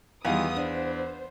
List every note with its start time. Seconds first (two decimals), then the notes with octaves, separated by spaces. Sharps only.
0.25 E2 D#3 E3 G3 B3 F4 F5 D#6
0.56 D4 C5